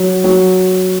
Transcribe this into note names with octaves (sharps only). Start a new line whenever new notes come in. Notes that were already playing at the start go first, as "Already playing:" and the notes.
Already playing: F#3
F#3